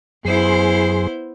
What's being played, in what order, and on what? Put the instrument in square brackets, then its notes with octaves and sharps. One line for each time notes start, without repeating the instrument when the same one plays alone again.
[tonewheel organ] F#2 G#4 C6 [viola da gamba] B3 E4 C5